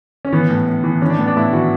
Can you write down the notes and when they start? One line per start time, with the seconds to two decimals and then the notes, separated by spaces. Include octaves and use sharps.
0.25 C#4
0.33 E3 B3
0.50 A2
0.67 A2
0.84 E3
1.02 E3 C#4
1.10 D4
1.18 A2 B3
1.28 D4
1.36 A2 E4
1.53 E3 F#4